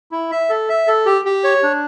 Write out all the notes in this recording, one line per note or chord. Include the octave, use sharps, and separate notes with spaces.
E4
E5
A4
E5
A4
G4
G4
C#5
D4